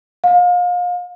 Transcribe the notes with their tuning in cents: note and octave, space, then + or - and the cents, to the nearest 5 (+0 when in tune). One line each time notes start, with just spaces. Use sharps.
F5 +30